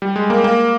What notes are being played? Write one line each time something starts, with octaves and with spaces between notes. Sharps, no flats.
G3
G#3
A#3
A#3